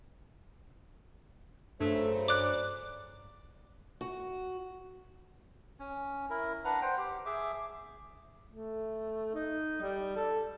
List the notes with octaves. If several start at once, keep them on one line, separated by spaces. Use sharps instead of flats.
G2 C#3 F#3 A3 C5
D5 D6 F#6
F#4
C#4
E4 A#4
D4 B4 F#5 A#5
C5 F#5 G5
G4
G#4 E5 D6
A3
D#4
G3
A4